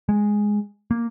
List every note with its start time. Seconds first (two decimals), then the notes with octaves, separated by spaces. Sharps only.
0.09 G#3
0.91 A#3